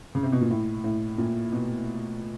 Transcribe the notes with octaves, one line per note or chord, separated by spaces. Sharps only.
C#3
C3
B2
A#2
A2
A2
A#2
B2